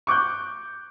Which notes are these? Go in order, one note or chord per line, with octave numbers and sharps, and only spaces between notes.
C#6 D6 F#6 G6